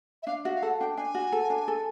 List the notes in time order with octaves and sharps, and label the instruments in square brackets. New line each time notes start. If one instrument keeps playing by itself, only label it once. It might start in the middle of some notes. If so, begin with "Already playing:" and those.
[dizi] E5
[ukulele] D4 [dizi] F5
[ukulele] F#4 [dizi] E5
[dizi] F5
[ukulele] A4 [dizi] F#5
[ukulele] D4 [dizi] G5
[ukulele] D4 [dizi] G#5
[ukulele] F#4
A4
D4
A4